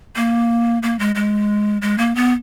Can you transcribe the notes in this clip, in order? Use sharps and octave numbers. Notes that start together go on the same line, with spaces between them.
A#3
A#3
G#3
G#3
G#3
A#3
B3